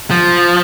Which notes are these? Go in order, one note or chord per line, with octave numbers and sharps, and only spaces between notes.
F3